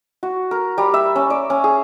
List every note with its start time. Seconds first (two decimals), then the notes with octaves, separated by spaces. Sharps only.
0.23 F#4
0.51 A#4
0.78 G3
0.94 E5
1.15 C#4
1.30 D5
1.50 C#4
1.64 G#4